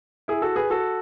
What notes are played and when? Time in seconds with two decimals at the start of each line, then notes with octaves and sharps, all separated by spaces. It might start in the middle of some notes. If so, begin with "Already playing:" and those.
0.28 E4 G#4
0.42 F#4 A4
0.56 G#4 B4
0.70 F#4 A4